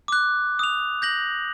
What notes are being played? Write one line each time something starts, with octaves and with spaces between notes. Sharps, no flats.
D6 F#6
D#6 F7
G6 A#6 F#7